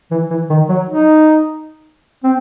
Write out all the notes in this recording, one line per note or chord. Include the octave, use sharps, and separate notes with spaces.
E3
E3
D#3
F#3
D#4
C4